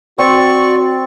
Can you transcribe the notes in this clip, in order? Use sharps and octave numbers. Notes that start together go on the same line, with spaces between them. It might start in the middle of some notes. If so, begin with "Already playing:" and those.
C4 F#4 D5 C#6